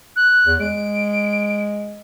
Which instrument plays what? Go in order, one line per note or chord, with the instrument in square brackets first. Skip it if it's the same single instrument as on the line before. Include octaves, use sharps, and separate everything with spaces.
[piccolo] F#6
[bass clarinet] E2
[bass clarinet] G#3 [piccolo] D7